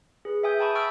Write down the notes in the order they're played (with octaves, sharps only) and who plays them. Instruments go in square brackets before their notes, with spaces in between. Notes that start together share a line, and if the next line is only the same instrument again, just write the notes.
[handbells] G#4 B4
E5 G5 G#5 D#6 G6
E5 G5 A5 B5 C#6
C#6 E6 F6 A6 D7